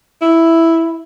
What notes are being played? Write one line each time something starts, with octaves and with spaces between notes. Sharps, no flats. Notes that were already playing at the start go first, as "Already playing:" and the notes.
E4